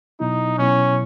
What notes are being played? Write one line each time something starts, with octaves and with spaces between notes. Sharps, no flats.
B2 F#3 B3 D#4 E4
B2 F#3 B3 C#4 E4